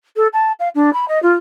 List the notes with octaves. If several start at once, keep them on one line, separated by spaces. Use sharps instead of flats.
A4
A5
F5
D4
B5
D#5
F4